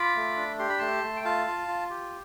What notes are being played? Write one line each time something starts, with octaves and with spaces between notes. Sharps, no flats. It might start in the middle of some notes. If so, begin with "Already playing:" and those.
Already playing: F4 B5 D6
A3
D4
G4 C6
B5
A3 A5 C6
A3
G5
F4 F5 A5
F4
F4
G4